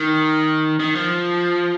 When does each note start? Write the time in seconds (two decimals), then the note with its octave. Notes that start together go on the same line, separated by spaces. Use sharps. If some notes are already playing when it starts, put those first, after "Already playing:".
Already playing: D#3
0.80 D#3
0.95 F3